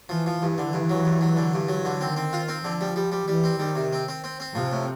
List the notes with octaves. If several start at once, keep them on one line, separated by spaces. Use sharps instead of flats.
E3 F3
F3
G2 E3
D3
G2
F#3
G2
F#3
D3
G2
F#3
D3
D#3 C4
C4
F4
C4
D3 F3
G3
G3
G3
E3 G3
C4
D#3 G3
C3
C4
C4
C4
C4
C3 F3
A2